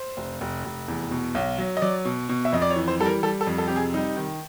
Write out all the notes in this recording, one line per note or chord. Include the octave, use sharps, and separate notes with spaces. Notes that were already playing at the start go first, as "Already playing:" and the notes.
Already playing: C5
F1
F1
F1
E2
B2
B1
F#3
D#5
F#3 D5
B2
B2
E5
F2 D#5
D5
C#5
E3
C5
G3 A4
A#4
G3 A4
A4
F2
A4
C3 G4
G#4
G3 D#4
D#3